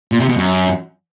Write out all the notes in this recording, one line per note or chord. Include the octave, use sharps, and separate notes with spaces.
A#2
C3
B2
F#2